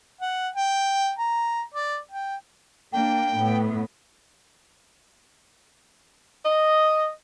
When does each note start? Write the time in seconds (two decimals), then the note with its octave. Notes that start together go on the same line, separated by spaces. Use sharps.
0.21 F#5
0.55 G5
1.19 A#5
1.74 D5
2.11 G5
2.93 A#3 D4 G5
3.37 A2 B3
6.45 D#5